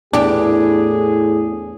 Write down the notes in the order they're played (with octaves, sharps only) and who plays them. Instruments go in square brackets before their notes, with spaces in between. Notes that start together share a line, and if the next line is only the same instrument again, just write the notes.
[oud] E2 G4 [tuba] A2 [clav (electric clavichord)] D4 [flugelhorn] G#4